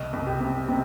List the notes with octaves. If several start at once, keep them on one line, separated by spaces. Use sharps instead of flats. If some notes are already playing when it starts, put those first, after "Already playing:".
Already playing: C2 D#5
C2
G4
C3
C3